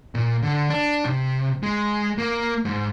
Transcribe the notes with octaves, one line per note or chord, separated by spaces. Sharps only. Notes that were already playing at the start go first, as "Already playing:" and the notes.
A#2
D3
D4
C3
G#3
A#3
G#2